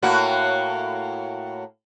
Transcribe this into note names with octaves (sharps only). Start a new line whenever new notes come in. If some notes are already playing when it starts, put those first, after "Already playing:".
A2 A#3 F#4